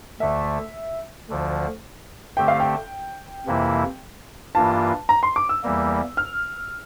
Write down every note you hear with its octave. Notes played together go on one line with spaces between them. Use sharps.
D2 D3 A3 E5
D2 D3 F3
D3 A3 C4 G4 G5
F5
G5
F2 C3 E3 A#3 E4
G2 E3 A#3 F4 A5
A#5
C6
D6
E6
E2 E3 G3 A#3
F6